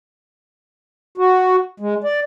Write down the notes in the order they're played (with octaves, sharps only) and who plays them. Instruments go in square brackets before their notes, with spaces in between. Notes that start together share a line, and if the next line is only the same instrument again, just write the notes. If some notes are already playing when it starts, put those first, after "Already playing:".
[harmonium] F#4
G#3
D5